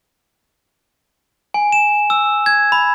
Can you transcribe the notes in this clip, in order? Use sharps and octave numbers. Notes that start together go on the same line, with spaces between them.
G#5
E7
E6
G#6
B5